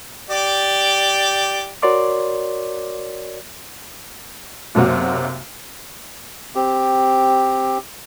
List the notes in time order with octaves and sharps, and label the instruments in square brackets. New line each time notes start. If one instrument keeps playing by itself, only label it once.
[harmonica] G4 D5
[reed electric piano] F#4 A#4 C#5 D5 C6 D6
[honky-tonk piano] B1 F#2 C3 A#3 F#4
[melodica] C4 G4